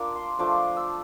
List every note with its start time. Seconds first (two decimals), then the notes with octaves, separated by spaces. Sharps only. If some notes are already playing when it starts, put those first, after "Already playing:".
Already playing: A#3 D4 F4 A#4 D6
0.15 C6
0.39 F3 A3 D4 F4 D6
0.77 E6